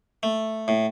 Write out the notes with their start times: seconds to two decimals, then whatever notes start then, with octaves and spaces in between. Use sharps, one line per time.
0.23 A3
0.68 A2